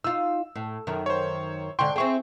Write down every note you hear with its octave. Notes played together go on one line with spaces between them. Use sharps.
D#4 F4 E6
A2
F#2 D#3
C5 C#5
G#2 D3 G5 C6 C#6
C4 E4 G#4 G5 C#6